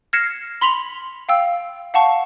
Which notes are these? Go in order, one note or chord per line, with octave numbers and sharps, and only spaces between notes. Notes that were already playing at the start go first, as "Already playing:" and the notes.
F6 G#6 A#6 C7 C#7 E7
B5 C6 B6 F7 F#7
F5 G5 E6
F5 F#5 A5 C#6